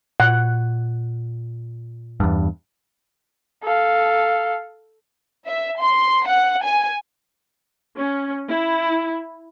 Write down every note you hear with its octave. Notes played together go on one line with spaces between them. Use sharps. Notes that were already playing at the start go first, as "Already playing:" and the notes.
A#2 F#5
E2 G2
A4 F5
E5
C6
F#5
G#5
C#4
E4